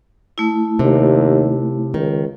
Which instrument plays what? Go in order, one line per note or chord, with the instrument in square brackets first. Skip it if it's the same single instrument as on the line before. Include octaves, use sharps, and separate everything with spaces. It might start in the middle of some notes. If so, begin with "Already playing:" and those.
[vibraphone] A3 E4
[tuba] D#2 [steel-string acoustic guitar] C3
[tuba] C#2 [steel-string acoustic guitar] D#3